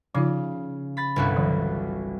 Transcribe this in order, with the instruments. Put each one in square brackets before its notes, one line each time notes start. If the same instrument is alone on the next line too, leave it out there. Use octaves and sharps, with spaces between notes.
[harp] C#3 [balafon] F3 D#4 F4
[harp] B5 A6 B6
G1 C2 F#4
[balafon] D3 E3 F#3